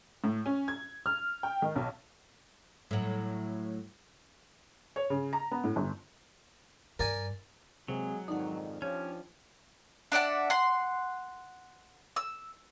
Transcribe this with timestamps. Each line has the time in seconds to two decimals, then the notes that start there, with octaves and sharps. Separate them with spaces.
0.24 A2
0.46 C#4
0.68 G#6
1.06 F6
1.43 G5
1.62 D#3
1.76 B1
2.91 A2 F#3
4.96 C#5
5.10 C#3
5.33 A#5
5.51 B3
5.64 A2
5.76 G1
6.99 G2 A#4 D5 G#5
7.88 C3 F#3 G#3 A#3 G#4
8.28 F2 G#2 D#3 D4 D#4 F#5
8.82 F3 C#4 G4 C#5
10.12 D4 D5 E5 F#5
10.50 F#5 C6
12.16 E6